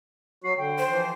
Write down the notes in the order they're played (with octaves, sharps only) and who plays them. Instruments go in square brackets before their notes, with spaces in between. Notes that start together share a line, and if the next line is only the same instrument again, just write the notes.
[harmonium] F#3 F#4 [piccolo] C7
[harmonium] D3 [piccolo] G5
[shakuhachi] C5
[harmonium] E3 F3